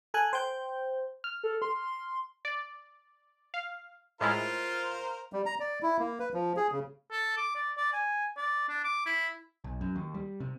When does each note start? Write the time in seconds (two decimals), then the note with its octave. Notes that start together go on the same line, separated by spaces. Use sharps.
0.14 A4 G#5 F#6
0.33 C5 G5 G6
1.24 F6
1.43 A4
1.62 C6
2.45 D5
3.54 F5
4.21 A2 G#3 E4 F4 A#4 C5 F5
5.33 G3
5.46 A#5
5.60 D5
5.83 E4
5.99 A#3
6.20 B4
6.34 F3
6.57 G#4
6.72 C#3
7.12 A4
7.37 D6
7.56 D5
7.78 D5
7.93 G#5
8.38 D5
8.69 D4
8.85 D6
9.06 E4
9.64 B1
9.81 F#2
9.96 D#2
10.14 G3
10.40 C3